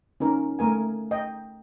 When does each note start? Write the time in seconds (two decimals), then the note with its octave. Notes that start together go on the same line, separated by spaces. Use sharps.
0.20 C#4 D#4 A#4
0.59 A3 A#4 G#5
1.11 D#5 G5